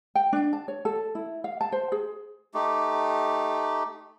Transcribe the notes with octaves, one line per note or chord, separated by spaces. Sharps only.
G5
D4
A5
C#5
A4
E4
F5
A5
C5
G#4
A3 D#4 G4